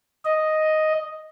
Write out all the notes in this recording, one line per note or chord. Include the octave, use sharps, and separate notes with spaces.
D#5